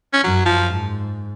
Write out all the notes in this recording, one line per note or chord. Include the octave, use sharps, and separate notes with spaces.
C#4
F#2 F#3
F3
G#2